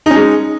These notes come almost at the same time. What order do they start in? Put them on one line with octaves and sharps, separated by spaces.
D#4 C#4 G#3